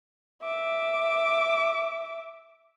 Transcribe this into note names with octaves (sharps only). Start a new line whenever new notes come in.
E5 D6